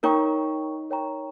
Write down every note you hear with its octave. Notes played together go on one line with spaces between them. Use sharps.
D#4 A#4 C#5 G5 A#5 C#6
A#4 C#5 G5 A#5 C#6